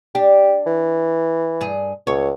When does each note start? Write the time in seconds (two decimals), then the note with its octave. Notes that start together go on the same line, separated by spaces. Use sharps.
0.15 D4 G4
0.67 E3
1.61 G2 G#4
2.07 C#2 C#5